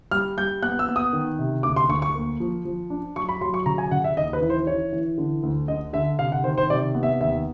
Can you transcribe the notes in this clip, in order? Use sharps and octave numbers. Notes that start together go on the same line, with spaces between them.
G3 F6
G3 G6
B3 F#6
E6
B3
D#6
D#3
C3
D2 D6
C6
D2 C#6
C#6
A#3
F3
F3
D4
F#3 C#6
B5
F#3 C6
C#6
C#3 A#5
G#5
C#3 F#5
E5
D#2 D#5
B4
E3
C5
E3 C#5
E3
D3
D2
D3 D#5
D3 E5
C3 F5
F#5
D#3 C5
C5
C3 D5
B3
E5
D#2 E5